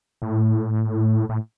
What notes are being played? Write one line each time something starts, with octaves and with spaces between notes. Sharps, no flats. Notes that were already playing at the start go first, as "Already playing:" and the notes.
A2
A2